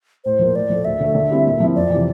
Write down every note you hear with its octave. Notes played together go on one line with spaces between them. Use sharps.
A2 C5
F3 A#3
A2 D5
F3 A3
D2 E5
D3 A3
D3
G3 C4 E4 G4
A#2
F3 C4 E4
F2 D5
E3
C3